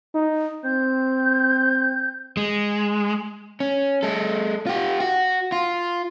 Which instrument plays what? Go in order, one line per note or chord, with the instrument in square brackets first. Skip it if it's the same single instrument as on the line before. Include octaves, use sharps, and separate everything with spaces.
[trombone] D#4
[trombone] C4 [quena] G6
[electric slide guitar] G#3
[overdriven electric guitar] C#4
G#3 A4
F4 G4
F#4
F4